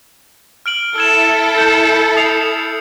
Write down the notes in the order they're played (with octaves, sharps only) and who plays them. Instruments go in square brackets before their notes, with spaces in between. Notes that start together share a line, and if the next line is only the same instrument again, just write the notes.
[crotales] F6 D7 F#7
[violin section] E4 A4 [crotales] E6 G#6 E7
[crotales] G6 C#7
D#6 C7 F7